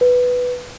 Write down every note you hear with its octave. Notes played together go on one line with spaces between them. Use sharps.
B4